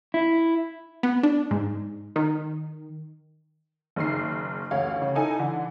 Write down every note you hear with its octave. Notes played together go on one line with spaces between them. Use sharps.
E4
B3
D4
G#2
D#3
F#1 D#3 C7
A1 D2 C#5 F5
C#3
D#4 E4 A4 G#5
D3 E3